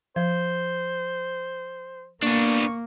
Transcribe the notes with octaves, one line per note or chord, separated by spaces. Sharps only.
F3 C5
A#3 B3 D4 C#6